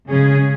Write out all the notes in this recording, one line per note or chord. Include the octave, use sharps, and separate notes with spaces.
C#3 G#3 C#4 G#4